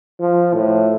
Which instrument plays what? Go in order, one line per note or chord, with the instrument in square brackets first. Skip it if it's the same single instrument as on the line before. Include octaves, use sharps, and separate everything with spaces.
[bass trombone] F3
A2